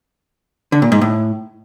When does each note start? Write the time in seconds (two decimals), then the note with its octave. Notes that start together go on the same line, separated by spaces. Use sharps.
0.72 D3
0.82 A#2
0.92 G#2
1.01 A2